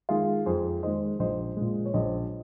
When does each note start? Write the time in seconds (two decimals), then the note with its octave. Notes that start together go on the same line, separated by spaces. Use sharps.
0.09 D#3 G#3 F4 G#4
0.46 F2 G#4 C5
0.83 D#3 G#3 C5 D#5
1.19 A#1 C5 D#5
1.57 A#2 G#3
1.86 C#5
1.94 A#1 C5 D#5